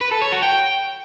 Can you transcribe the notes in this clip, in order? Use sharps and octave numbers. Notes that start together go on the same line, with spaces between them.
B4
A4
C#5
F#4
G5